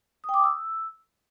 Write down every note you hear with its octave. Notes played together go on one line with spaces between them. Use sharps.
D#6
G5
D6
D#6
E6